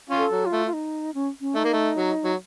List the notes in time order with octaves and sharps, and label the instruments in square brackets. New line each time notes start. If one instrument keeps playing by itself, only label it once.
[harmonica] C#4 F4
[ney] A4
[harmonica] F#3
[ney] F4
[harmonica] A3
[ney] F4
D#4
C#4
C#4
[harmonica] A3 [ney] D#4
[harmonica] A#3
A3
F#3
F#3